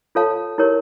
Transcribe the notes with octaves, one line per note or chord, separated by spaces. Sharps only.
F4 A4 C#5 F5 A5
E4 G4 A#4 C#5